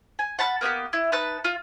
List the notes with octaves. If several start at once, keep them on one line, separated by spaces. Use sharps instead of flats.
G#5
F#5 A5 B5 F#6
A#3 B3 F4 G4
E4
D#4 B4 A5 F#6
F4